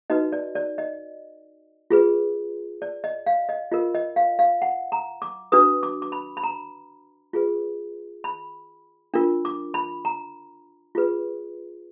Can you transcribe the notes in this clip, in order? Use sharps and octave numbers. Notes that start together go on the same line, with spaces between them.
D#4 F#4 B4 D#5
D5
D5
D#5
F4 G#4 B4
D5
D#5
F5
D#5
F4 A#4 D#5
D#5
F5
F5
F#5
A#5
D6
D4 F#4 B4 D#6
D6
D6
B5
B5
A#5
F4 G#4 B4
B5
D4 F4 A#4
D6
B5
A#5
F4 G#4 B4